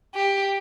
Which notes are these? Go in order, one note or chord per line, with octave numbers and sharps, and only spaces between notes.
G4